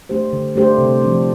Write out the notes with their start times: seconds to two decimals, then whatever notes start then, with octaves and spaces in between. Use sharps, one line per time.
0.09 A3 D4 G4 C5
0.33 D3
0.56 A3 D4 G4 C5
0.78 C3
1.02 F3 D4